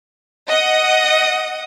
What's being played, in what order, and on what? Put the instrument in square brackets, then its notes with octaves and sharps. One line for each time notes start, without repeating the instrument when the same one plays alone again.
[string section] D#5 F#5 D#6